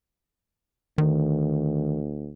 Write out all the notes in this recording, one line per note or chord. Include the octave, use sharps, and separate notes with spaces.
D2 D#3